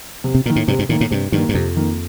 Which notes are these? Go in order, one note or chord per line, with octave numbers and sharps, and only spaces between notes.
C3
C3
A#2 D#3 A#3
A2
G2 C3
G2
A2 D#3 A#3
A2
G2 C3
G2 D#3 A#3
G2
F2 C3
D#3 A#3